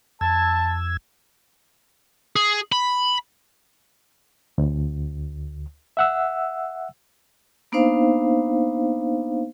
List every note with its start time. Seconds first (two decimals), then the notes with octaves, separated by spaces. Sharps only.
0.21 F2 A5 E6 G#6
2.36 G#4
2.72 B5
4.58 D2
5.97 E5 F#5 E6
7.72 A#3 B3 D4 D#4 C5 F5